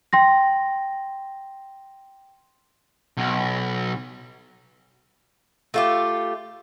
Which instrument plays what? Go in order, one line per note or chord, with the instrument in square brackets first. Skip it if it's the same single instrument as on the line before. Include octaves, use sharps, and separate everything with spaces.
[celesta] G5 C6 A#6
[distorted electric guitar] B1
[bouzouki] A3 F4 G4